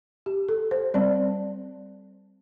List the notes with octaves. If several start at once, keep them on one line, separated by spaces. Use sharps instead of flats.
G4
A4
C5
G3 C4 D5